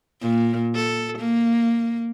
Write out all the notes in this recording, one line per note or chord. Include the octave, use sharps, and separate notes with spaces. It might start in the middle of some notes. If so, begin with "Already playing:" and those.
A#2
A4
A#3